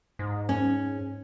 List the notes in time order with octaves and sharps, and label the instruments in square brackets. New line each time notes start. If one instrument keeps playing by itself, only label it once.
[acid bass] G#2
[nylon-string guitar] C#4